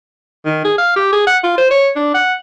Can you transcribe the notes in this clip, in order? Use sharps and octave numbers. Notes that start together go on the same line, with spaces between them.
D#3
G#4
F5
G4
G#4
F#5
F4
C5
C#5
D4
F#5